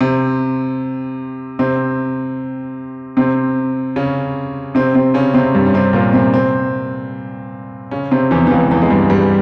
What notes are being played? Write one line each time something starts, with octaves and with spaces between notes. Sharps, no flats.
C3 C4
C3 C4
C3 C4
C#3 C#4
C3 C4
C3 C4
C#3 C#4
C3 C4
G2 G3
C#4
C3 C4
A#2 A#3
C3 C4
C3 C4
C#3 C#4
C3 C4
E2 E3
E3
C#2 C#3
E2 E3
G#3
G2 G3
G2 G3